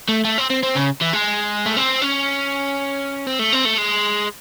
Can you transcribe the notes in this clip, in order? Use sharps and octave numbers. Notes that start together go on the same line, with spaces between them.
A3
A3
C4
C4
C4
C#3
E3
G#3
A3
C4
C#4
C4
A3
C4
A3
G#3